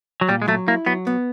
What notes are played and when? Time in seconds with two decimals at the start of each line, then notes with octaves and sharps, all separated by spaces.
0.21 F#3
0.29 A#2 G3
0.42 G#3
0.48 F#3 A3
0.68 A#3 E4
0.86 F#3 B3
1.07 B3